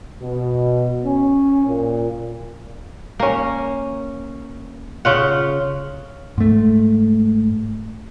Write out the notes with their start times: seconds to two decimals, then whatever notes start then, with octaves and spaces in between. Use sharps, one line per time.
0.20 B2
1.04 C#4
1.67 A#2
3.20 A#3 C#4
5.05 C#3 F4 F#5
6.38 G#2 A3